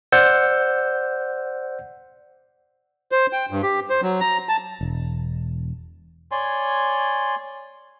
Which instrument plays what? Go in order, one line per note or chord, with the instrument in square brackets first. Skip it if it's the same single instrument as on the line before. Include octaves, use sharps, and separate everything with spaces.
[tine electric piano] C5 D5 F#5 E6 G6
[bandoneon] C5
G5
G2
G4
C5
F#3
A#5
A5
[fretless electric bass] E1
[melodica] C#5 D5 G#5 C6